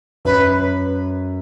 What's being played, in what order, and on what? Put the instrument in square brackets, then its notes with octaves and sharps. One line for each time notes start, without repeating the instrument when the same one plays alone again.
[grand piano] F#2 [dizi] B4